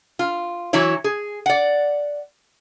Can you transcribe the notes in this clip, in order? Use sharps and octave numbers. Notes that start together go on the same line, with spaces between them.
F4
E3 F#3 E4 C#5
G#4
D5 F#5